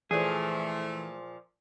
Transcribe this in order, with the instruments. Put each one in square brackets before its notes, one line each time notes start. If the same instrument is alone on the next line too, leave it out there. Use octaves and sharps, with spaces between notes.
[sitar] A#2 F3 [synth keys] E3 E4 B4 [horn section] A3 [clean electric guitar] G#4